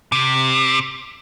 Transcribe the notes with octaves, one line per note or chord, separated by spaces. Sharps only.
C3